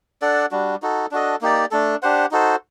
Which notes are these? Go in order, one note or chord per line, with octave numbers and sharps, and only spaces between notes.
D4 A4 D5 F#5
G3 D4 F#4
D#4 F#4 A4
D4 F#4 A4 D#5
A#3 D#4 G4 D5
A3 D4 A4
D4 G4 C5 F#5
D#4 F#4 A4 C5